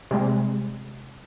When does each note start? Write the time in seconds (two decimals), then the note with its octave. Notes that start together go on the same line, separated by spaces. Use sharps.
0.11 C3 G3 G#3